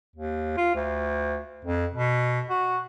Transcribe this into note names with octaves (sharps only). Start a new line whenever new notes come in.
D#2
F4
D2
F2
B2
F#4